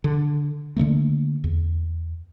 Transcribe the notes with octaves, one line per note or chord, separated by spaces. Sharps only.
D3
D3 F#3 A3 A#3
E2